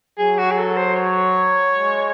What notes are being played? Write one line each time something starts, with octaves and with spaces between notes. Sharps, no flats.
F#3 G#4
F#4
G#4
A4
C5
C#5
G#3